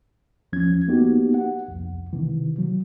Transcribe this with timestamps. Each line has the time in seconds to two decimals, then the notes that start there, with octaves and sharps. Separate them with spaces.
0.53 E2 F3 C#4 G#6
0.88 A#3 B3 D#4 F#4 G4
1.34 F#5
1.68 C2 F2
2.13 C3 D#3 E3
2.58 F#3